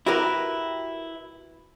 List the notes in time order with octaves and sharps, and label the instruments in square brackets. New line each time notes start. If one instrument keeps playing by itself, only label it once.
[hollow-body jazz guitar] E4 F#4 G4 A#4 B4